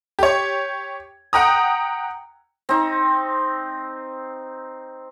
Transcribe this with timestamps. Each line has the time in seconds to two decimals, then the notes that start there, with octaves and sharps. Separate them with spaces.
0.19 G4 C#5
1.33 F#5 G5 A#5 D#6
2.69 C4 D#4